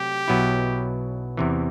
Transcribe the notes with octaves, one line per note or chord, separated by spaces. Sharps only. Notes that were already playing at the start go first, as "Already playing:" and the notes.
Already playing: C3 F#3 A3 G4
B1 B2 F#3 B3 E4
E2 C3 E3